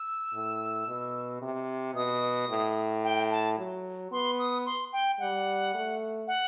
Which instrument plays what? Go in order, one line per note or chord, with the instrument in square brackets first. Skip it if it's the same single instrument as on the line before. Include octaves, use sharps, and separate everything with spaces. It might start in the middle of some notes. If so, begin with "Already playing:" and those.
Already playing: [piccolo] E6
[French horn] A2
B2
C3
[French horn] B2 [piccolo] D#6
[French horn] A2
[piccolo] G5
A5
[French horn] F#3
[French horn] B3 [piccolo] C6
[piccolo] D#6
C6
G5
[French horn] G3 [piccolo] F#5
[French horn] A3
[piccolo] F#5